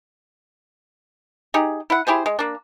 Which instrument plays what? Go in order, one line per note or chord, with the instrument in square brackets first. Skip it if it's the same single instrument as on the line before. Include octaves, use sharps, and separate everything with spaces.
[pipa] D#4 G4 G#4
E4 F#5
E4 G4 G#4 C5
G#3
A#3 D4